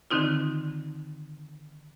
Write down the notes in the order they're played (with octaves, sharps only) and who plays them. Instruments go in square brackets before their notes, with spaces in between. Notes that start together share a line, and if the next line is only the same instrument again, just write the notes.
[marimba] D3 D#3 C4 D#4 F4